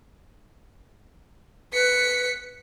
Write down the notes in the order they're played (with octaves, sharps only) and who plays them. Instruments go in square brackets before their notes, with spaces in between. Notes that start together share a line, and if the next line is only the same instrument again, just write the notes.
[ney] B4 [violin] B6 C#7